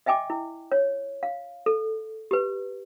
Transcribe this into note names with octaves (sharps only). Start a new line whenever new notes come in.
D#5 E5 G5 G#5 D6
E4
C#5
F5
A4
G4 B4